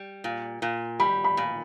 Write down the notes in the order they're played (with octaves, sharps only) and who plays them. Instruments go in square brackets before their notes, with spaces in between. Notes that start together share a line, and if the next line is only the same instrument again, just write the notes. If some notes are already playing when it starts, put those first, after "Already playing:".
Already playing: [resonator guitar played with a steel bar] G3
A#2
A#2
[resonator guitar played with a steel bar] G3 [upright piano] B5
[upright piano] B5
[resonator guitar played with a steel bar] A#2